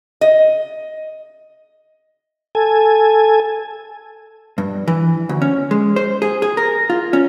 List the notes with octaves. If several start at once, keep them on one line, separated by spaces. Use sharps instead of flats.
D#5
A4 G#5
G2
E3
D2
C#4
G#3
C5
G#4
G#4
A#4
F4
C#4